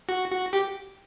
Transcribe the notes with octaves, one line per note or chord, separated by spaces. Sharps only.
F#4
F#4
G4